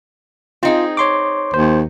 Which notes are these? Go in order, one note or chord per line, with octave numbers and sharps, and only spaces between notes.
C4 D#4 F4 G#4
C#5 C6 D6
D#2 C5